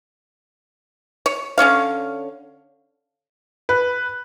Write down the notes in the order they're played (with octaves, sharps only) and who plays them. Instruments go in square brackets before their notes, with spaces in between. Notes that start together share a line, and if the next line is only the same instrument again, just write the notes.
[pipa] C#5
D3 C#4 C#5 F5
[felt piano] B4